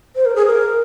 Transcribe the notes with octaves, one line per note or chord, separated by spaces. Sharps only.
C5
A#4
G#4
A#4